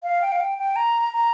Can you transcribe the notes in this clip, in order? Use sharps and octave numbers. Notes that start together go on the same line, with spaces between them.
F5
G5
F5
G5
G5
A#5
A#5